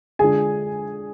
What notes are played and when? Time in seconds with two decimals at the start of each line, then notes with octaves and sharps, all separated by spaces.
0.19 D3 G#3 D4 F4 G#4 G#5